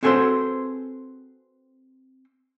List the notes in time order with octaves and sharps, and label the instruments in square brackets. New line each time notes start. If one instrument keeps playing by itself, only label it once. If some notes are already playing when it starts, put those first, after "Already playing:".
[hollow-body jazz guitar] C4 F#4 G#4 A4 B4 C5